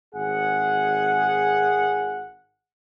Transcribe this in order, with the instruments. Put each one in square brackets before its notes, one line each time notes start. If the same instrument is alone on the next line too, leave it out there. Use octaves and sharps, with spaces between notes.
[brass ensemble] G#1 G#4 F#5